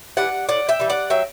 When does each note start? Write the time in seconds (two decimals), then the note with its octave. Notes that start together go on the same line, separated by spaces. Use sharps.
0.17 E3 G3 D5 F#5
0.49 A2 D5 F#5
0.69 E5 G5
0.80 E3 G3
0.90 D5 F#5
1.10 F#3 E5 G5